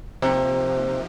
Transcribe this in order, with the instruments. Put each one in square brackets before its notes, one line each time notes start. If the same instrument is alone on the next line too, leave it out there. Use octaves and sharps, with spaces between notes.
[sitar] C3 [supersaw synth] F3 A#3 D#4 G4